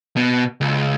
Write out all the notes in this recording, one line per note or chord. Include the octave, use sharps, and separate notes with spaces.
B2
C#2